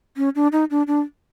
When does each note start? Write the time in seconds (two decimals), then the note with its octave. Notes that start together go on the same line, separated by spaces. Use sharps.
0.17 C#4
0.35 D4
0.52 D#4
0.71 D4
0.87 D4